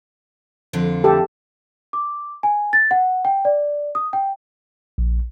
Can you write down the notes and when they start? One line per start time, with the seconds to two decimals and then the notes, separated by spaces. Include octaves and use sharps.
0.73 F2 D3 F4
1.04 G4 A4
1.93 D6
2.43 G#5
2.73 A6
2.91 F#5
3.25 G5
3.45 D5
3.95 D#6
4.13 G5
4.98 A#1